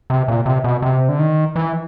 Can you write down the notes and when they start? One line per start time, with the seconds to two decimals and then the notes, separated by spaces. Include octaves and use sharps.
0.10 C3
0.28 A#2
0.46 C3
0.64 B2
0.82 C3
1.09 D3
1.19 D#3
1.56 E3